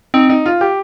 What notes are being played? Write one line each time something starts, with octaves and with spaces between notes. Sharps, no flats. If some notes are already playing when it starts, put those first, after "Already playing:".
C4 D#4
D#4
F4
G4